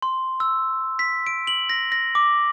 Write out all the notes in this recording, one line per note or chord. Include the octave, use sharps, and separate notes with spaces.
C6
E6
B6
D7
F#7
A#6
A#6
D6